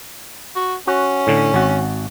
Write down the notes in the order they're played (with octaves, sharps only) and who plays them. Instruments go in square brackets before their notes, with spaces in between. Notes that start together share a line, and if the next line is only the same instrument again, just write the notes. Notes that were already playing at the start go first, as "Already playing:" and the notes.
[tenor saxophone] F#4
[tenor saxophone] C#4 [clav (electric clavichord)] F#4
[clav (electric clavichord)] A2 D3
G#1 F#4